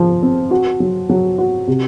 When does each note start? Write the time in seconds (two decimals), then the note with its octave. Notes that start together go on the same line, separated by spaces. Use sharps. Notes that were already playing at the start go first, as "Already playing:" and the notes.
Already playing: F3
0.22 C4
0.51 F#4
0.80 F#3
1.09 F#3
1.38 F#4
1.68 C3